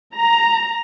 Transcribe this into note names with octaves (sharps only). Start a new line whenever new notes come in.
A#5